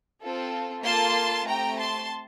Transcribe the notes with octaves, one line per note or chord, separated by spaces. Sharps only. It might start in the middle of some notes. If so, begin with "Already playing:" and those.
C4 F4 A4
A#3 F4 A4 A5 C6
A3 C4 G4 G5 A#5
A5 C6